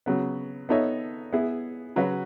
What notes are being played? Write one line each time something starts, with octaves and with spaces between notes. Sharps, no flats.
C#3 F#3 B3
B3 D#4 A4 C#5 E5
B3 E4 G#4
C#3 F#3 C#4 F#4 B4